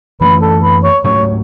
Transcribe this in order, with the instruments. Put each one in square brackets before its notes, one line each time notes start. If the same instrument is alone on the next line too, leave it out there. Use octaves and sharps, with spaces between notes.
[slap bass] F#2 E3 A3 C#4 [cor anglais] B4
[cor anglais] A4
B4
C#5
[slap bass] G#2 F#3 A3 C#4 [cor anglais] C#5